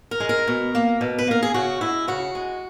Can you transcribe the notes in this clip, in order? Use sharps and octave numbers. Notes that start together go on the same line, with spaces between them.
A#4
G#3
A#4
B2
A#3
B2
B4
A#3 A#4
G#4
C#3 F#4
G#3 E4
C#3 F#4
G#3